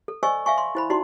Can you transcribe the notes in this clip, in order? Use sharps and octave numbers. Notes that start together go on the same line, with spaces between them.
A4
C5 D5 D#5 G#5 C#6 E6
E5 F5 G#5 C#6
C6
E4 C5 B5
D#4 F#4 D5 C6